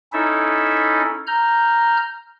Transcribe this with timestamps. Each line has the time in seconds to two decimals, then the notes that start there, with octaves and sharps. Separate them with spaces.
0.13 C#4 D#4 E4 A4 E5
1.27 A#5 F6 G6